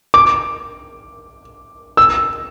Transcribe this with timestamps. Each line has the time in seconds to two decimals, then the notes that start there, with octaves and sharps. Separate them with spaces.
0.14 D6
1.97 E6